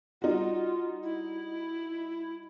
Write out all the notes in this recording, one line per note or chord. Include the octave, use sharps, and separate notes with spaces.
G3 D#4 F4 F#4
E4